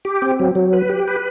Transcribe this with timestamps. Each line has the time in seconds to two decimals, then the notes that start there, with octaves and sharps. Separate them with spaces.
0.05 G4
0.22 C4
0.40 F#3
0.55 F#3
0.73 B4
0.89 G4
1.08 B4